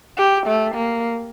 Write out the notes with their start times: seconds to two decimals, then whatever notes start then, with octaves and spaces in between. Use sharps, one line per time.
0.18 G4
0.47 A3
0.75 A#3